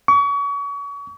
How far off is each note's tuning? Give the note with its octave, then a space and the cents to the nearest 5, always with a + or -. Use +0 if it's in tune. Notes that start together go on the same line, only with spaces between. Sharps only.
C#6 +35